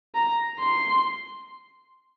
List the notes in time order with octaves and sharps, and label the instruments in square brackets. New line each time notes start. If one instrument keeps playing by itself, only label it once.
[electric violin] A#5
C6